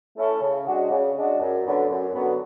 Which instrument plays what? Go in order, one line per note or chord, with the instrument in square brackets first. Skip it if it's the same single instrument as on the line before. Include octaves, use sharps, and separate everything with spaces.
[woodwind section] A3 C#4 E4 A4
C#3
G#3 D4 F#4
C#3
G#3 D4 F#4
F#2
D3 F#3 B3
F#2
D3 F#3 B3